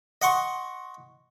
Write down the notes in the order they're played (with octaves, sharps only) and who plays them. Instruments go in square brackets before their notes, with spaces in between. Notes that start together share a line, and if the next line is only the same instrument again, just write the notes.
[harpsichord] D#5 F#5 C6 C#6